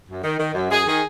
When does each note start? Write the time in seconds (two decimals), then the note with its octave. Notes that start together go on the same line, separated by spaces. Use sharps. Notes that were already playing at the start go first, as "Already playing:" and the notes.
0.09 F#2
0.24 D#3
0.39 D#3
0.54 F#2
0.70 F#2 G#4
0.86 D#3 G#4